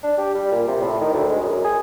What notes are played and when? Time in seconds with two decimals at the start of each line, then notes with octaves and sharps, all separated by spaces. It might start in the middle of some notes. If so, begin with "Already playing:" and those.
0.03 D4
0.17 G4
0.35 G3
0.51 A#2
0.68 C3
0.81 A2
1.01 D#3
1.13 D2
1.29 G#3
1.42 F#2
1.65 G#4